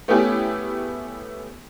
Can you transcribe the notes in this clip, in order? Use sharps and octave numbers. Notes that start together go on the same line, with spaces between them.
A3 B3 C#4 E4 G4 G#4